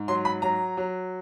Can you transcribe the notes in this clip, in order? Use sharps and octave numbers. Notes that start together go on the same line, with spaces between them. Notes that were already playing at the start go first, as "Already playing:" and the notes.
Already playing: G#2
F#3 C6
B5
F#3 A#5
F#3